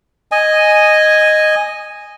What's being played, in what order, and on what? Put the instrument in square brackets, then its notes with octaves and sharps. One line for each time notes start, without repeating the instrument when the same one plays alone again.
[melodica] D#5 G#5